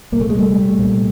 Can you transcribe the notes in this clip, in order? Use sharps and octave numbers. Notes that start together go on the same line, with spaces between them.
C2 A#2 A3 A#3
G#3
G3 A3
C2 A#2